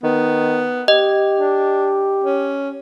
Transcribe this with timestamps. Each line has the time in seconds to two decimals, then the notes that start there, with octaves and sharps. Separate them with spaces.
0.03 D#3 B3
0.88 G4 D#5
1.39 D4
2.24 C#4